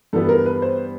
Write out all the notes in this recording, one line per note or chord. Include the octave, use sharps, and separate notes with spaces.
G2 E3 G3 B3 A4
A#4
B4
C5